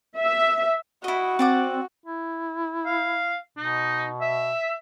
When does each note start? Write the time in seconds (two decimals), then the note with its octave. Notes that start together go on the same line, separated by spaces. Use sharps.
0.19 E5
1.04 E4 F#4 D#5
1.39 C4 D5 F#5 D6
2.06 E4
2.86 F5
3.57 B2 D#4
4.21 E5